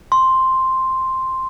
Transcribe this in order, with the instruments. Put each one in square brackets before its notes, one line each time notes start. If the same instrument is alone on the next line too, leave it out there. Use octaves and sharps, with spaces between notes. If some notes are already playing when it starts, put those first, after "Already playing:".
[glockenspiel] C6